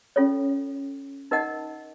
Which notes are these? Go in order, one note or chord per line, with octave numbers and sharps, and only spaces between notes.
C#4 F4 A4 C#5
D#4 A#4 D#5 F#5 A5